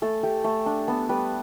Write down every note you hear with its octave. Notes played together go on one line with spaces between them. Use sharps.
A3 A4
A3 G4
A3 A4
D4
B3 A4
G3 B4